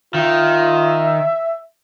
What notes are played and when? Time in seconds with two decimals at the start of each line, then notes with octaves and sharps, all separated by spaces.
0.14 D#3 F4 E5